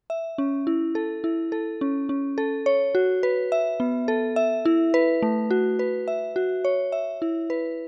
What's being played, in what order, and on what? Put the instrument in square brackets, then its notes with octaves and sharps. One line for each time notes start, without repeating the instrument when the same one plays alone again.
[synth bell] E5
C#4
E4
A4
E4
A4
C#4
C#4
A4
C#5
F#4
B4
E5
B3
A4
E5
E4
B4
A3
F#4
B4
E5
F#4
C#5
E5
E4
B4